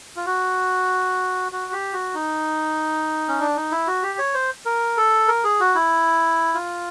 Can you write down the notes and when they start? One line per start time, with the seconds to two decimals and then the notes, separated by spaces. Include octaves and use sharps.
0.16 F4
0.26 F#4
1.52 F#4
1.72 G4
1.93 F#4
2.14 D#4
3.28 C#4
3.40 D4
3.56 D#4
3.71 E4
3.87 F#4
4.03 G4
4.19 C#5
4.34 C5
4.65 A#4
4.97 A4
5.28 A#4
5.44 G#4
5.60 F#4
5.75 E4
6.54 F4